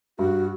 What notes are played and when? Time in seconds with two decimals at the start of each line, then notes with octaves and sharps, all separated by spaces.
0.18 G2 F#4